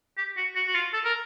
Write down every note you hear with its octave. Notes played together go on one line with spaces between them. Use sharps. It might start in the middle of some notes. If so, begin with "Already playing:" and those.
G4
F#4
F#4
F#4
F4
A4
A#4